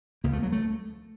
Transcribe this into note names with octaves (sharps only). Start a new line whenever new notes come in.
C#2 A#3
A3
F#3
A3